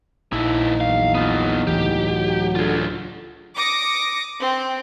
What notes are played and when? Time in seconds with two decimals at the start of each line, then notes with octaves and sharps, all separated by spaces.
0.33 A#1 F3 D#4 E4
0.80 E2 F#3 F5
1.15 B3 F4
1.67 C#2 A2 E3 G4
2.00 F#3
2.55 D3 F4 G#4
3.55 D6 D#6 A#6 C#7
4.39 C4